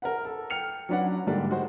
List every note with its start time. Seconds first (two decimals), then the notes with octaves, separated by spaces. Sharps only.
0.02 A#4 B4 F#5
0.25 A4
0.50 G5 F6 C#7 F7
0.89 F#3 C#4 D4 B4 F#5
1.27 G#2 D3 G3 A#3 D4 G4
1.49 G#3 F#4 C5